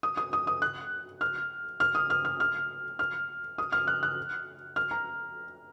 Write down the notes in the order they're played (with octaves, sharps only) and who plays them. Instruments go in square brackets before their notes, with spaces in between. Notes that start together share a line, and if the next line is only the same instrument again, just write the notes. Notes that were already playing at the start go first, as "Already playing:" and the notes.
[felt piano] D#6
D#6
D#6
D#6
F#6
F6
F6
D#6
F6
F6
F6
F6
D#6
F6
F#6
F#6
F6
A#5